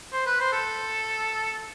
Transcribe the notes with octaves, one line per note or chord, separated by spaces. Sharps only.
C5
B4
C5
A4